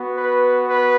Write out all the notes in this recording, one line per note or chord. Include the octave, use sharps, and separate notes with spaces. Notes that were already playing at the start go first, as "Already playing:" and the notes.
Already playing: B3 F#4
B4
B4